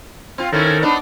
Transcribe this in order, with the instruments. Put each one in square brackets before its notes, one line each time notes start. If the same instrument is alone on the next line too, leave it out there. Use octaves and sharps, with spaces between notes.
[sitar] C4 F4
[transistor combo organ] D#3 A4 A#4 [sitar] C4 C#4 E4
[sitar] B3 D4 D#4